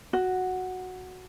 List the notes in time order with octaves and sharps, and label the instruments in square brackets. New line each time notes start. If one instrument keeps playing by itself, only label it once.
[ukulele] F#4